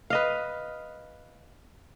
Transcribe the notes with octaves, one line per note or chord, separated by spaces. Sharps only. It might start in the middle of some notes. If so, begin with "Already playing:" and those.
B4 D#5 F5